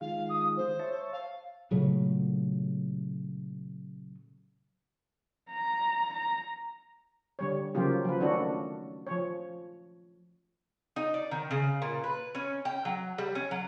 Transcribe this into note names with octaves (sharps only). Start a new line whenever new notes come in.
D#3 G#3 F4 F5
D#6
C5
C#5 E5 A5
F5
A#2 C#3 F#3 A3
A#5
A#5
D3 G3 C#5
C#3 F3 F#3 A#3 F4 G4
F3 B4
D#3 A3 C#4 D4 F#4 A4
F3 C#5
D#4
D5
D#3
C#3
A#2
B4
C#4
G5
F#3
G3
C#4
F#3